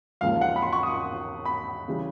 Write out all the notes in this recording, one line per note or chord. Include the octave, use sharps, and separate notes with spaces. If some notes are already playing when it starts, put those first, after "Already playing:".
E1 D#2 C#3 F3 F5
F#5
B5
C6
C#6
D#6
C#6
B5
C#3 E3 G3